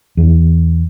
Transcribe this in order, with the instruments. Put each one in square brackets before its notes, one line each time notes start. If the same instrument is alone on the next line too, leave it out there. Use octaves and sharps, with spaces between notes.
[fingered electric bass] E2